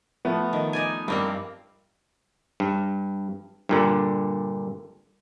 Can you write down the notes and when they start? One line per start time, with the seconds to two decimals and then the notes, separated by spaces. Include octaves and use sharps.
0.25 F3 A3 B3
0.53 D#3
0.73 D#4 D5 G#5
1.08 G2 G3 A#3 C4
2.60 G2
3.69 G2 A#2 D3